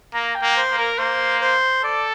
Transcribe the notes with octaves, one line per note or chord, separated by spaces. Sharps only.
A#3 A#5
G5
A#3
C5
A#3
A#4
A#3 C5
C5
A4 D5